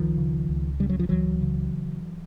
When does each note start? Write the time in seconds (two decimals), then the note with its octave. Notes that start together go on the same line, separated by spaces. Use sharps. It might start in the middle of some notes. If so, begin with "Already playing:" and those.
Already playing: C#2 D#3 F3
0.18 C#3
0.49 C#2
0.80 C#3 G3
0.89 F#3
0.99 F3
1.09 C#2 E3 F#3
1.41 C#3